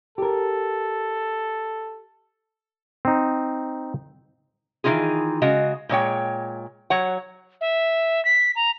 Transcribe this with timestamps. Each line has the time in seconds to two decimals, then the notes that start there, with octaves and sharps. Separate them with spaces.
0.18 G4 A4 A#4
3.05 C4 D#4
4.84 D#3 E3 G#3 D#4 F4 G#4
5.42 C#3 G#3 F#4 D#5
5.89 A#2 G#3 C#5 G5
6.90 F#3 C#5 F#5
7.61 E5
8.25 B6
8.56 A#5